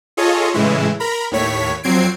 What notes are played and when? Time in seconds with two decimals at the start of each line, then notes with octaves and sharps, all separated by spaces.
0.17 F4 G#4 A4 C#5 D#5
0.54 A2 C#3 E3 G#3 E4
1.00 A#4 A#5 B5
1.31 D#2 A2 C#5 B6
1.83 F2 F#3 C4 G#6 C7 D7